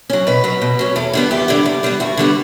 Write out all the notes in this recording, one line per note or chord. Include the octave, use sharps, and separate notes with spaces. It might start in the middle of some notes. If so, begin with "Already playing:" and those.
F#3 C#4
B2 B4
F#3 C#4
B2
F#3 C#4
E2 A4
D3 G3 B3
E2 G4
D3 G3 B3
E2
D3 G3 B3
E2 F#4
D3 G3 B3